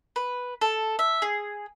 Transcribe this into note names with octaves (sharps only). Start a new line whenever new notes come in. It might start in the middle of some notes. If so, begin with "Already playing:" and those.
B4
A4
E5
G#4